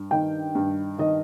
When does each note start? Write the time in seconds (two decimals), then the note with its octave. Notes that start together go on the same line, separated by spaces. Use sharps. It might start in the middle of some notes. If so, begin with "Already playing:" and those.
Already playing: G2
0.11 D#3 G5
0.55 G2
0.98 D#3 D#5